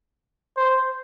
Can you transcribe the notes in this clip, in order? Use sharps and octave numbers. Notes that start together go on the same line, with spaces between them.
C5